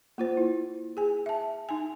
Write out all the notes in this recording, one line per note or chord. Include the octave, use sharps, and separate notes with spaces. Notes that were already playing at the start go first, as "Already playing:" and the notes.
A#3 F4 C5
E4
G#4 G#5
E5 A5
D#4 G#5